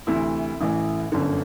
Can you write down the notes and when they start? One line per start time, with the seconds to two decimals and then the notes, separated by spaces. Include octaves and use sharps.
0.07 D2 C3 E3 E4
0.61 A1 A2 E3
1.12 G1 F#2 D3